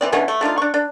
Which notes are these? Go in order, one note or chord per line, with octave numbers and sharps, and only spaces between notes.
E3 C4 D5
B2 D3 E3 C#4
A3
A3 D4 D#4 F4
D4 C#6
D4